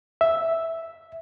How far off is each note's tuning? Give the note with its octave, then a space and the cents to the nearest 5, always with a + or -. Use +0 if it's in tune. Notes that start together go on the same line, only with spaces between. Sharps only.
E5 -5